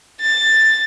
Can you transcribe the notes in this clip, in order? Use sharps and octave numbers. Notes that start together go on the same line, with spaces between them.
A6